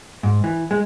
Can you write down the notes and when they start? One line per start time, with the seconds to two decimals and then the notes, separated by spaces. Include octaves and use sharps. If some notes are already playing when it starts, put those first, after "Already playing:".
0.23 G#2
0.44 E3
0.71 G#3